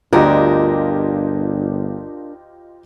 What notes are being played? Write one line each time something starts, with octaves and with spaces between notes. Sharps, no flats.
G1 D2 D4 F4 G4 A#4 D#5